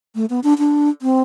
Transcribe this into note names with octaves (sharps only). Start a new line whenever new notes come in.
A3
B3
D4
D4
C4